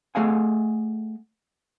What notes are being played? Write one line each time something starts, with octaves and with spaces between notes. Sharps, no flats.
A3 G#4 D#5 F5 F#5 G#5